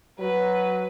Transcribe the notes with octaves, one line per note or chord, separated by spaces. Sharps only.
F#3 B4